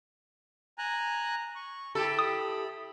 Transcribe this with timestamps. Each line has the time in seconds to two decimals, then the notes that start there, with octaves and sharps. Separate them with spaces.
0.78 G#5 A#5 F#6
1.55 C#6
1.95 E4 G4 A4 B5
2.19 D#6